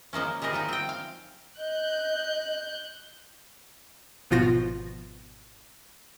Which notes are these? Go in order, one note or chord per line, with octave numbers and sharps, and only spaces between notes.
F3 G#3 A#3 C#4
G3 G#3 G#4 A#4 D#5
F3 G#3 D#4
C4 G5
F5
D#5 F#6 G6
G#1 B2 F3 F4 F#4 A#6